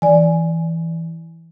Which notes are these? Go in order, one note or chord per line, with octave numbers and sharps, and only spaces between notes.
E3 D5 G#5